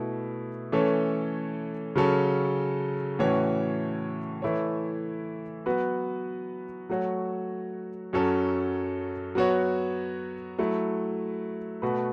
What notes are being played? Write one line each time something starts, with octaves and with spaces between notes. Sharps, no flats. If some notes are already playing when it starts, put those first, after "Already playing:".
Already playing: B2 A3 E4
E3 A3 C#4 A4 C#5
C#3 F#3 C#4 A4
A2 E3 C#4 F#4 C#5
E3 A3 E4 C#5
F#3 B3 F#4 B4
F#3 A3 F#4 C#5
F#2 F#3 C#4 A4 C#5
F#3 B3 F#4 C#5
F#3 A3 E4
B2 A3 F#4 B4